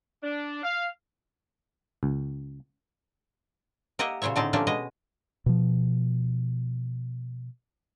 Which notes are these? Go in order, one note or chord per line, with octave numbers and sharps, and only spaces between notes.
D4
F5
C#2
A#3 G4 D#5 E5 F#5
A#2 C#3 C5 C#5 E5
A2 D3 C4 D#4 G#4 A5
F3 A3 A#3 C#4 D4 G4
B2 G#3 D#5
B2 F3